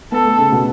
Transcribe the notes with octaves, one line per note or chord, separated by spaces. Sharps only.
B3 A4
A3
C#3
B2